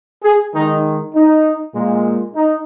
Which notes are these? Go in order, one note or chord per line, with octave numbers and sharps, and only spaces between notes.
G#4
D#3 G#3 D#4
D#4
A#2 G#3
D#4